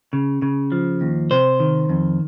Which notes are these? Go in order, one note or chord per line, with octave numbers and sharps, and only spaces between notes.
C#3
C#3
F3
D#2
C3 C5
D#3
F2